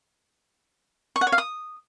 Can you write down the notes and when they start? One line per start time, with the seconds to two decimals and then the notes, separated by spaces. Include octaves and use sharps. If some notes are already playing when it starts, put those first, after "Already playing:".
1.16 C#6
1.21 F#5
1.27 C#5
1.32 F5
1.38 D#6